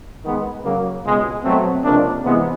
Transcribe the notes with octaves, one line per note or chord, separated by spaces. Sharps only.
D#3 G#3 B3
C#3 F#3 A#3
C#2 B2 G#3
B2 F#3 A3 C4
C#2 C3 F3 A#3 D4
C3 E3 G#3 B3